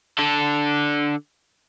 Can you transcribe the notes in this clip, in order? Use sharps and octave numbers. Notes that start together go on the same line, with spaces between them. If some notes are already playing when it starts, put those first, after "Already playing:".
D3 A4